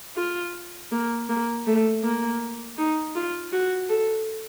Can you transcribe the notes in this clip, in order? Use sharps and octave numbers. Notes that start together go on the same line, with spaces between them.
F4
A#3
A#3
A3
A#3
D#4
F4
F#4
A4